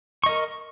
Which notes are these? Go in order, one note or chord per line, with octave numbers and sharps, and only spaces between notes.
A#4 D#5 C#6